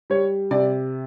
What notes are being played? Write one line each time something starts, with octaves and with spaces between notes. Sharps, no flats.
G3 C#5
C3 D5